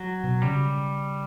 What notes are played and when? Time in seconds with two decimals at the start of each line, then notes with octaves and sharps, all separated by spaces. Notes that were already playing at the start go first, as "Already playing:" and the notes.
Already playing: F#3
0.24 B2
0.42 C#3 G3